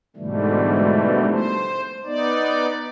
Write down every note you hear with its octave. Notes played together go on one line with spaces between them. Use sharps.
G#2 B2 D3 E3 G3 A3
C5
B3 D#4 D5